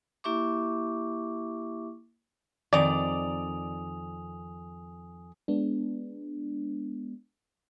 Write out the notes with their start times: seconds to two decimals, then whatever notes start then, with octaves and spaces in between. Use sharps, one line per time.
0.24 A#3 E4 G4 E5 C#6 D6
2.73 F2 D#3 D5 G#5 D#6 F7
5.48 G#3 B3 D4